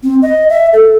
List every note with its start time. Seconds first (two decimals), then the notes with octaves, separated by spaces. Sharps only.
0.03 C4
0.22 D#5
0.50 E5
0.73 A4